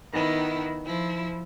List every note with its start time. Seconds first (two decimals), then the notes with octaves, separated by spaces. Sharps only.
0.12 D#3 B3 E4
0.85 F3 E4